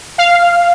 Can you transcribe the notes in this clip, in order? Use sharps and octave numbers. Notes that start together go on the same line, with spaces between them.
F5